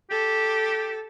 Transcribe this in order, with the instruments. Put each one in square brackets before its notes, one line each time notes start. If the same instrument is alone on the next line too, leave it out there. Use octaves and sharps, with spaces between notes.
[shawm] G4 [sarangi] A4